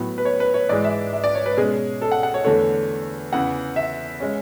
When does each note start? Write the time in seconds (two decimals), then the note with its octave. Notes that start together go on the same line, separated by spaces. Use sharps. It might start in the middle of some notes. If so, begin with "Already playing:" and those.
Already playing: A2 F#3 B3
0.18 B4
0.25 C#5
0.40 B4
0.54 C#5
0.69 G#2 E3 G#3 D5
0.84 E5
1.13 E5
1.24 D5
1.35 C#5
1.46 B4
1.57 B2 G#3 C#4 G#4
2.01 A4
2.12 F#5
2.23 F#5
2.34 C#5
2.44 E2 D3 A3 C#5
3.32 E2 C#3 E3 F#5
3.76 E5
4.20 G#3 C#4